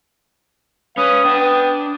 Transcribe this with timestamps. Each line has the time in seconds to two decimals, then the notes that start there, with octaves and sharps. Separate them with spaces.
0.98 C#4 B4 F5 D#6
1.25 B3 D4 G5